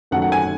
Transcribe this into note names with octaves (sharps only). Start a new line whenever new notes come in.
F#1 F#2 D#3 F#3 A3 F#5
F#5
G#5